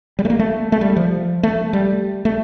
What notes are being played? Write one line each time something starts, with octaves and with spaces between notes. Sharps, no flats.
G3
A3
A#3
A3
A3
G3
F3
A3
G3
A3